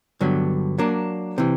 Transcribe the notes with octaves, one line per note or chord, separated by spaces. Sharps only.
G2 D3 F#3 B3
F#3 A#3 D4
C3 E3